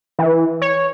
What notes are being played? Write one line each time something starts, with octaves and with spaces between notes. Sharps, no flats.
E3
C#5